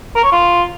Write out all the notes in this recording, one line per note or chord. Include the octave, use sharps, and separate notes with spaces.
A#4
C#5
F4